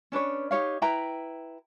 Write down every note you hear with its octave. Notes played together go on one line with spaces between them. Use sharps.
C#4 D4 B4 C#5
D#4 G4 C#5 F5
E4 B4 G5 A#5